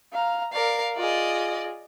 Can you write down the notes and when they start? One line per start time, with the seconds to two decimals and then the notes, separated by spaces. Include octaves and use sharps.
0.12 F5 A#5
0.53 A#4 D5 F5
0.96 F4 G#4 D5 D#5